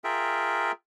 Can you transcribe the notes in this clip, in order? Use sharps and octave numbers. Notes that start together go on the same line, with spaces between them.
F4 G#4 A#4 E5 G5